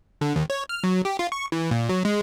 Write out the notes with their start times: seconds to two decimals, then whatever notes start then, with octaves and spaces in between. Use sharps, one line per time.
0.21 D3
0.36 D#2
0.50 C#5
0.69 F6
0.84 F#3
1.05 G4
1.19 F4
1.32 C#6
1.52 E3
1.71 A#2
1.89 F#3
2.05 G#3